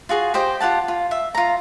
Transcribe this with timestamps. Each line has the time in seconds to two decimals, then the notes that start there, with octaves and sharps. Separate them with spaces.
0.09 F4 F#4 G#4
0.34 G4 C5 D#5 G5
0.60 F4 G4 F#5 A5
0.88 F4
1.11 E5
1.34 F4 A#5